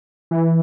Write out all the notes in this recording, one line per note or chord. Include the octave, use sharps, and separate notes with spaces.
E3